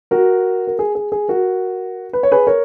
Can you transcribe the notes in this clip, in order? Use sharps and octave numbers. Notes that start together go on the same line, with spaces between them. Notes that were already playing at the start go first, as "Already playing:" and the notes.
F#4 A#4
A#4
G#4
G#4
G#4
F#4 A#4
B4
C#5
G#4 B4
A#4 C#5